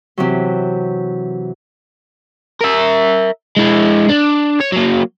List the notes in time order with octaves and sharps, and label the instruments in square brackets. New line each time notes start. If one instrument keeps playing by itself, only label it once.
[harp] C3 E3 F#3
[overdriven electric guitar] A#4 E5
G#3 E4
D4
C#5
F#3 A#3